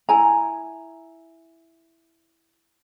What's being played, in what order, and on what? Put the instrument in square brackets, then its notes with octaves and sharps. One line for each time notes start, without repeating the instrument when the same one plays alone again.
[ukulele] E4 G#5 A#5